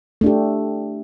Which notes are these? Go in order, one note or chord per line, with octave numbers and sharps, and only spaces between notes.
A3 D4 G4